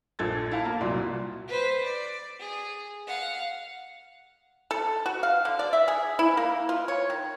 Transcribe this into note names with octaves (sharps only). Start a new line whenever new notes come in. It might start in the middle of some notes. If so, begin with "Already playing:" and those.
A#1 A#2 A4 E6 G#6 A6
E4 F5 A5
A#3
C2 A#2 F#3 D5 C6
B4 C5
D5
G#4
F5 F#5
A4
F#4
F5
D3
D5
E5
G#4
E4
A#3
F4
C#5
D#3